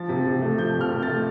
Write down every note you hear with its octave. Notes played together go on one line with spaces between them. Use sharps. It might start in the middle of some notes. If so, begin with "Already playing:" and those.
Already playing: F3 A6
C3
C3
A3
F3 G6
C3
F6
C3
A6
A3